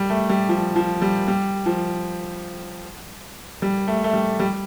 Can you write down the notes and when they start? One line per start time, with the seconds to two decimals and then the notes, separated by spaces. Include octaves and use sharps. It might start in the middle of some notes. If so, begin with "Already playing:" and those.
Already playing: G3
0.10 A3
0.30 G3
0.49 F3
0.76 F3
1.02 G3
1.28 G3
1.66 F3
3.62 G3
3.88 A3
4.04 A3
4.13 G3
4.40 G3